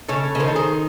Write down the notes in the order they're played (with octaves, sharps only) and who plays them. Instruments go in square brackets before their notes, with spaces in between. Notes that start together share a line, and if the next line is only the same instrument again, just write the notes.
[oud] C#3 [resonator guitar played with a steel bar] A4 C#5
[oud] C#3
[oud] D#3 [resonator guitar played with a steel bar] C5
[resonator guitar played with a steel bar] A4
G#4 C5